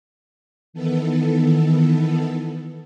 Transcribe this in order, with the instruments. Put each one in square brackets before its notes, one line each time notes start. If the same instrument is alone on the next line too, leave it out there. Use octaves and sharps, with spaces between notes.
[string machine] D#3 E3 B3 A4